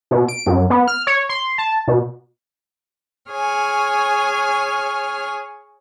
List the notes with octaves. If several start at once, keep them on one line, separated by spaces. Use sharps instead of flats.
B2
D7
F#2
B3
F6
C#5
C6
A5
B2
G#4 C#5 G#5 F6